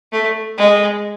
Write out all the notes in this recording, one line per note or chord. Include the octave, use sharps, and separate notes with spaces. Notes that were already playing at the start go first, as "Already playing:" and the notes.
A3
G#3